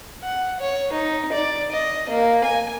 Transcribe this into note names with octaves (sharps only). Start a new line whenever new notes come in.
F#5
C#5
D#4
D5
D#5
A#3
G#5